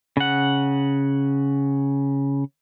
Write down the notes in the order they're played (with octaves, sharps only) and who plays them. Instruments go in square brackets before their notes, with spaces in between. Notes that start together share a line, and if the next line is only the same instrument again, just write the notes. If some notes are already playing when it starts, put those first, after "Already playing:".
[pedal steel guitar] C#3 F#5